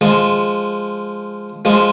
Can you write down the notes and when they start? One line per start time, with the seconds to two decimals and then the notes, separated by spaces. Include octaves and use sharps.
0.01 F3 G#3
1.65 F3 G#3